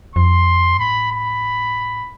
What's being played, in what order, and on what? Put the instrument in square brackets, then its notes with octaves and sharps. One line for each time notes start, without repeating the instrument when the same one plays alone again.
[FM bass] F2 [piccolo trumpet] C6
[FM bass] G2
[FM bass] A2 [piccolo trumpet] B5
[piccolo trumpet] B5